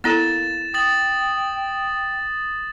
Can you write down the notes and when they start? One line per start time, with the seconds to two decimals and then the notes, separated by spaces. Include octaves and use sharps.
0.04 A#3 B3 E4 A4 A6 E7
0.74 G5 D#6 A6 F#7